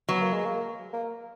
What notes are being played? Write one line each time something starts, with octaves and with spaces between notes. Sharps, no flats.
F#3 B3
A#3
G#3
A#3
A#3